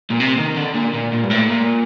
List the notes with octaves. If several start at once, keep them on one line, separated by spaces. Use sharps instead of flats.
A#2
C3
D#3
D3
A#2
A#2
A#2
G2
A2
A#2